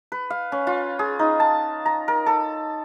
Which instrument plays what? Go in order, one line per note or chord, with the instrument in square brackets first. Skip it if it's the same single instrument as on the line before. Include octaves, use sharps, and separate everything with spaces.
[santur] B4
F5
C#4
F4
G#4
D#4
A5
A#5
A#4
A4